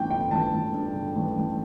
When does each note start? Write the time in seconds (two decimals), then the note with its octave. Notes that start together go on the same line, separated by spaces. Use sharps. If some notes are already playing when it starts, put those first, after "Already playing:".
Already playing: A1 G2 G5
0.11 D3 G5
0.31 A1 A5
0.52 A1
0.74 G2
0.94 D3
1.16 A1
1.37 A1